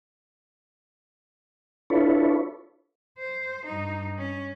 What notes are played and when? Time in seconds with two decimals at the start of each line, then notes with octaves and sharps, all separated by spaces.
1.90 D4 E4 F4 A4 B4 C#5
3.19 C5
3.65 G2 D#4
4.18 C#4